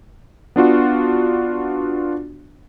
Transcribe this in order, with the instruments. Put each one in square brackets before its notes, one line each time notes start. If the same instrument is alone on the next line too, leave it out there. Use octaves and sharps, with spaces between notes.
[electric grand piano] B3 D4 F4 F#4